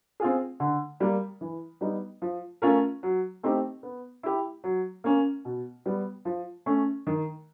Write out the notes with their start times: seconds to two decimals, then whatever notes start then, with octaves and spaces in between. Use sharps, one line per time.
0.20 C4 F4 G#4
0.60 D3
1.00 G3 A#3
1.41 E3
1.81 G3 B3 D#4
2.22 F3
2.62 A3 C#4 F4 A#4
3.03 F#3
3.43 A3 C4 D#4 G4
3.83 B3
4.23 E4 G4
4.64 F#3
5.04 A#3 C#4
5.45 B2
5.86 G3 B3
6.25 F3
6.66 A3 C#4
7.07 D#3